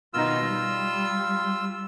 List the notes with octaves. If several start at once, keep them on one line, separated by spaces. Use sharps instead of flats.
B2 D#3 D#4 F4 E6
G3